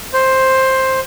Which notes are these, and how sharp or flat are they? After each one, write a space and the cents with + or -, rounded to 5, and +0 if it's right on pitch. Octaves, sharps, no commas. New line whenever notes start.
C5 +10